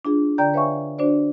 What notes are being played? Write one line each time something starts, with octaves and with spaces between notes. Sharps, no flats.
D4 F4 G#4
D3 D5 G5 A#5 G6
B4 C#5 E5 F5 G#5 C#6
D4 F#4 C5 D5